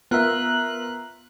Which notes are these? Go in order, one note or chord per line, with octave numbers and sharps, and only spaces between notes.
B3 F4 A#4 E5 F#6